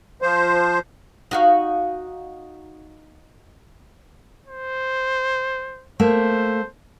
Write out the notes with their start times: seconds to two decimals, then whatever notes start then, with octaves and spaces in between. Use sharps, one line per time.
0.22 F3 C5
1.31 D#4 F#4 F5
4.47 C5
6.00 A3 A#3 C5